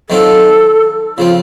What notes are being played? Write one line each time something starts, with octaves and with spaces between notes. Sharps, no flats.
D#3 F#3 C4 F4 A4
C#3 F3 C4 F4